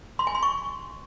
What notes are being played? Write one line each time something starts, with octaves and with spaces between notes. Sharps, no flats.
C6
G#5
C6
C#6